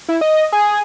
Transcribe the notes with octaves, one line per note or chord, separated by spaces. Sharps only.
E4
D#5
G#4